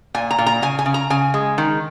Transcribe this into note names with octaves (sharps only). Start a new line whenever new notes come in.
A#2 G#5
A#5
A#2
A#5
C#3 G#5
G#5
C#3
A#5
C#3 G#5
G#3
D#3